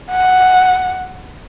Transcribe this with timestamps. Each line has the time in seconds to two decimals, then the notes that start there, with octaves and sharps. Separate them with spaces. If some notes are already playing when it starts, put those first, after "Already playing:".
0.11 F#5